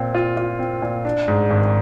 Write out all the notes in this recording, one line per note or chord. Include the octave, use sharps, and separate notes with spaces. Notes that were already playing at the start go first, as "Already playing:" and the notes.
Already playing: A#2 C4
F4
F4
C4
A#2
D4
G#2
G#1